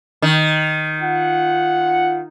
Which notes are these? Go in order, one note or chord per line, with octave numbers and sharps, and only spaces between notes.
D#3
F4 F#5